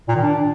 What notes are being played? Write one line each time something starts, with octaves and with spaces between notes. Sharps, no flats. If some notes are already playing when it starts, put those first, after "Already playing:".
A#2
D#3
D4